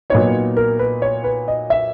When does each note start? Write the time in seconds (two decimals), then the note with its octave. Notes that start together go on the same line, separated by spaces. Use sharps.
0.10 A#2 F#3 B3 D#4 C#5
0.57 A#4
0.79 B4
1.02 C#5
1.24 B4
1.48 D#5
1.70 E5